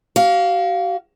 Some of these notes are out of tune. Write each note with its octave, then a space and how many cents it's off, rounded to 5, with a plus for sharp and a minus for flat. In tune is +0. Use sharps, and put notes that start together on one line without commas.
F#4 +45 F5 +0